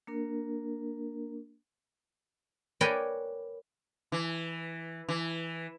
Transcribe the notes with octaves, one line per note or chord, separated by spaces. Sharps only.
A#3 D4 A#4
A#4 B4 C#5 D5 G5 G#5
E3
E3